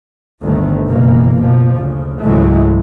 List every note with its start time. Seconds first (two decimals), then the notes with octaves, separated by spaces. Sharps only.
0.42 G1 D2 D#3 A3
0.88 F#1 B2 E3 A#3
1.38 B2 F3
1.76 D2 C#3
2.20 C#2 G#2 E3 F#3 G#3 A3